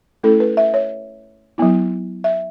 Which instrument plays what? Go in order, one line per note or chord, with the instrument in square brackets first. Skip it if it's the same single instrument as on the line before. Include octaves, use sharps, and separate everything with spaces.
[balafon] A3 C#4 E4 A4
B4
E5
C#5
F#3 B3 E4
E5